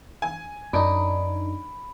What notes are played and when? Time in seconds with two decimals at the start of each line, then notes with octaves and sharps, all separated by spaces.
0.22 G#5
0.73 F#2 D4 D#4 B5 D7